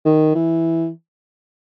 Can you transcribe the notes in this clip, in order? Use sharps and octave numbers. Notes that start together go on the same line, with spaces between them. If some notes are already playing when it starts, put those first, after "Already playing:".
D#3
E3